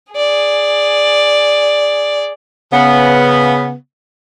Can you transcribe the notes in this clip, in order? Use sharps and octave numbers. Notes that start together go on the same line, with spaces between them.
G#4 D5
C#3 B3